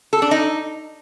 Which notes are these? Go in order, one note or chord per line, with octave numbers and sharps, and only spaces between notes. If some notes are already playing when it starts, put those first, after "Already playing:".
A4
D4
D#4